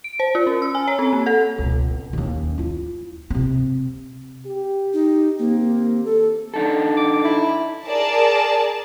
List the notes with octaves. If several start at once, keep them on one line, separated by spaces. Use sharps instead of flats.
D7
C5
F4
C#4
E6
G#5
C#5
C4
A#3
A4
C#2 B2
D#2 C#4
E4 F4
C3 C4
G4
D#4
D#3 A#3 C4 G4
A4
D4 D#4 A4
D6
E4
G#4 A#4 D5 A5